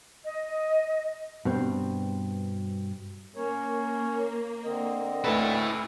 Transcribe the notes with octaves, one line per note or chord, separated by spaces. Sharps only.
D#5
G2 B2 C4
A#3 C#4 C#5
D3 C4 D#5
D2 A3 E4 A4 B4